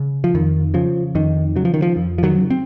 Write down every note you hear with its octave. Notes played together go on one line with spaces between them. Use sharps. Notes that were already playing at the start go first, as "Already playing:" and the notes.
Already playing: C#3
F3
F2 D#3
C#3 F3
F2 D#3
C#3 F#3
F3
D#3
F3
F2
F3
D#3 F#3
C#3
C4